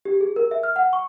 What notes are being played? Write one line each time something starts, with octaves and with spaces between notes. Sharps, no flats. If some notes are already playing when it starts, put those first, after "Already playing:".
G4
G#4
A#4
E5
F6
F#5
C#6